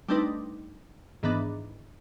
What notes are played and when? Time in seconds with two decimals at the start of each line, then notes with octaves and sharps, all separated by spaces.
0.08 G3 A3 C4 D4 D#4 B4
1.23 G#2 D#3 E3 B3 D4